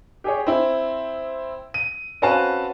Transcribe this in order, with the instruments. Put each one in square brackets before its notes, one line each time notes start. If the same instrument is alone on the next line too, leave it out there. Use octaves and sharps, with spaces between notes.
[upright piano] G4 G#4 C#5
C4 E4
D#7
C4 C#4 F#4 B4 F5 A5